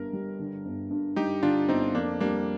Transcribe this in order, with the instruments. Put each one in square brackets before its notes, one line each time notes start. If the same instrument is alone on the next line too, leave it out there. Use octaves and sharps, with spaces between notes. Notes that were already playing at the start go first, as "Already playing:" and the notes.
Already playing: [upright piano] G1 G2 D3 G3 [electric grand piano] A#4
[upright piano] G3
D3
G1
G2
[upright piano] G3 [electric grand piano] D#4 G4
[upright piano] D3 [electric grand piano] D4 F4
[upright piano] G1 [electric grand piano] C4 D#4
[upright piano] F2 [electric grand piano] A#3 D4
[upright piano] G3 [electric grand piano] A#3 D4